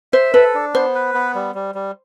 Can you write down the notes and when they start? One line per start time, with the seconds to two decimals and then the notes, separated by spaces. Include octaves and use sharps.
0.13 C5 E5
0.34 A4 B4
0.55 D4
0.74 B3 C5
0.95 B4
1.14 B3
1.35 G3
1.55 G3
1.75 G3